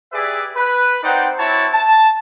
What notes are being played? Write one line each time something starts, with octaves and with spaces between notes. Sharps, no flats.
G4 G#4 B4 D5 E5
B4
C4 D#4 C5 D5 F#5 G5
C4 E4 F#4 C#5 A5
A5